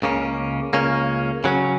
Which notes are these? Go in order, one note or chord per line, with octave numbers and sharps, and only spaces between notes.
C#2 C#3 A#3 C#4
C#2 C#3 A#3 C#4
C#3 F#3 C#4